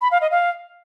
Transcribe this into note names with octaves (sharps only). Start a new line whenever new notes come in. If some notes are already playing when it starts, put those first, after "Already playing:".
B5
F5
D#5
F5